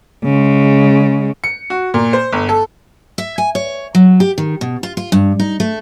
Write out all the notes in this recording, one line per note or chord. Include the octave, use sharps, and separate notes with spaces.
C#3 G#3
C#7
F#4
A#2
C5
G1
A4
E5
G#5
C#5
F#3
G4
D#3
B2
F4
F4
G2
D#4
A3